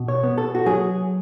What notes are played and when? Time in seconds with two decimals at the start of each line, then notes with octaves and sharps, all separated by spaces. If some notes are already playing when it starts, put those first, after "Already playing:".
Already playing: B2
0.08 C#5
0.24 B3
0.38 A4
0.55 F#4
0.66 F#3 G#4